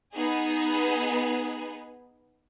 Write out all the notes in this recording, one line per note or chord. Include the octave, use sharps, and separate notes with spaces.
B3 D#4 G#4